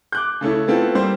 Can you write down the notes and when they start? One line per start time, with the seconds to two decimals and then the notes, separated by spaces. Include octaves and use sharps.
0.12 D6 F#6 G6
0.41 C#3 A3 C#4 E4
0.68 A3 B3 C4 E4 F4 A4
0.95 G3 A#3 C4 C5